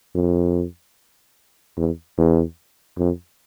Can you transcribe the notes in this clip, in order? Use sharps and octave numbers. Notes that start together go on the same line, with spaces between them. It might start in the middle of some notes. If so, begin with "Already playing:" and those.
F2
E2
E2
F2